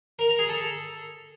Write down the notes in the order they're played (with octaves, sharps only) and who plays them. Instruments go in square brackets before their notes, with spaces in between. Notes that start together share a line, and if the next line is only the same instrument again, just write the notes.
[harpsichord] A#4
A#5
G#4
A4